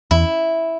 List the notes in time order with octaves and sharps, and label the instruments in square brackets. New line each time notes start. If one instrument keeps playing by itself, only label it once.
[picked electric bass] E2 [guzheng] E4